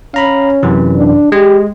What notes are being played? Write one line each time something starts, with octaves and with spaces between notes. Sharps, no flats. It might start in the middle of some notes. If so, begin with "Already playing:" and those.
C#4 F5 A#5 B5
F#2 C3 E3
D4
G#3 G4